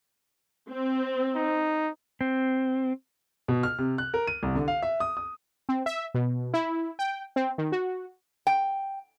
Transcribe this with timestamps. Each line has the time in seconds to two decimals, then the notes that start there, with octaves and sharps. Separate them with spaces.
0.70 C4
1.36 D#4
2.21 C4
3.48 B2
3.63 F6
3.78 C3
3.98 F#6
4.14 A#4
4.27 D#7
4.43 C2
4.55 D3
4.68 F5
4.83 E5
5.00 D#6
5.17 D#6
5.69 C4
5.86 E5
6.14 B2
6.54 E4
6.99 G5
7.36 C4
7.58 D#3
7.72 F#4
8.47 G5